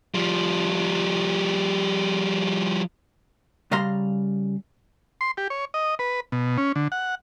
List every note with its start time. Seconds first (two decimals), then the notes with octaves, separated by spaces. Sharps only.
0.14 F3 G3
3.71 C#3 G3 F5 A#5 C6
5.21 C6
5.37 G4
5.50 C#5
5.74 D#5
5.99 B4
6.32 B2
6.58 C#4
6.76 D3
6.92 F#5